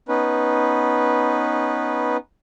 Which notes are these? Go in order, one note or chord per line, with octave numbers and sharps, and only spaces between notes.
B3 C#4 D#4 B4